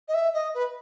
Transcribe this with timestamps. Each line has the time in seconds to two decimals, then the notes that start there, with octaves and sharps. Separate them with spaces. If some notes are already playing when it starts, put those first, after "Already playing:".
0.08 D#5
0.14 E5
0.34 D#5
0.54 B4